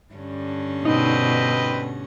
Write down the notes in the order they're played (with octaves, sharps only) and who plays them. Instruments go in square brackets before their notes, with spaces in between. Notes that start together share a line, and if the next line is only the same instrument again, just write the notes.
[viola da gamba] G2 D3 C#4
[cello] B2 [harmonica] C4 B4 D#5 [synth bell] D#4